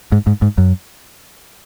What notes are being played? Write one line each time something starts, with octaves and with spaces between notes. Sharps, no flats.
G#2
G#2
G#2
F#2